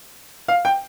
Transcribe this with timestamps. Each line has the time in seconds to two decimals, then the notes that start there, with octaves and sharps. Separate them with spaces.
0.48 F5
0.65 G5